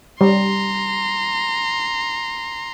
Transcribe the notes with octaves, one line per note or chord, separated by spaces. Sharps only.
G3 A#5 C6